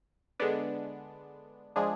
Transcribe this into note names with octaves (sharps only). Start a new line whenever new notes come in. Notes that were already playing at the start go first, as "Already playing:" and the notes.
D3 G#3 B3 D4
F3 G#3 D4 G#4